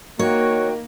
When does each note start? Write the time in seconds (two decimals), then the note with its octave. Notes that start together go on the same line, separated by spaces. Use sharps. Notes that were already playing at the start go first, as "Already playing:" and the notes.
0.19 D#3 A#3 F#4 C#5 G5 C#6